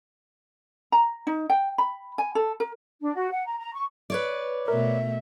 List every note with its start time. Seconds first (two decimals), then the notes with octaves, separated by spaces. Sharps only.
0.92 A#5
1.27 D#4
1.50 G5
1.78 B5
2.18 G#5
2.35 A4
2.60 A#4
3.01 D4
3.14 F#4
3.32 F#5
3.46 A#5
3.58 A#5
3.74 C#6
4.10 B4 C#5 D5
4.68 B2 A3 A#4 E5